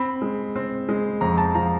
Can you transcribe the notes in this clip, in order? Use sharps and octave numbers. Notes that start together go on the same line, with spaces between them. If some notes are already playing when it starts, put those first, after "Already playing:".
Already playing: C4 B5
G#3
C4
G#3
F2 A#5
A5
F3 A#5